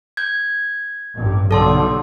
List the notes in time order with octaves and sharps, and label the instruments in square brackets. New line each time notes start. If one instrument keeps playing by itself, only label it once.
[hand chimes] G6 G#6
[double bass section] A1 G2
[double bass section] B1 D3 G3 [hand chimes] A4 A5 C6